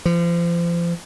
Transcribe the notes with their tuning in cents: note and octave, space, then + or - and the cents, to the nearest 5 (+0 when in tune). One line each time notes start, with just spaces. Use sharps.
F3 -35